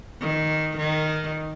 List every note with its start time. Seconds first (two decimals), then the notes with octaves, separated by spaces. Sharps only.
0.22 D#3
0.78 D#3